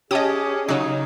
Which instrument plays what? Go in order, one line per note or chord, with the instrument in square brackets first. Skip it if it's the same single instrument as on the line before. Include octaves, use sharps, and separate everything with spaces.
[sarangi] C#4 [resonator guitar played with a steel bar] G4 [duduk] G#4 [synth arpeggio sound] D#5 A5 D#6
[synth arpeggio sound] C#3 F#4 [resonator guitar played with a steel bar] F#3 [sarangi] D#4